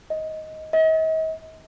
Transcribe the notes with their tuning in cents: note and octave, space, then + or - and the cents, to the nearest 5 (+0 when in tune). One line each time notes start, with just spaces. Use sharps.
D#5 +10
D#5 +40